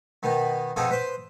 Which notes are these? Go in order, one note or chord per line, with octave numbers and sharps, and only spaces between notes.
B2 D#3 B3
F2 B2 D#4 F4 G#4 A4
B4 C5 C6